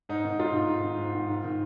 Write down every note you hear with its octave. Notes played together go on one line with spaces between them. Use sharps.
G#2 D#4
D#3
G#2 F4
D#3
G#2
D#3
G#2
D#3
G#2
D#3